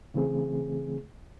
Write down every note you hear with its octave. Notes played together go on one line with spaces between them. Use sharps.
C#3 E3 A3 C4 G#4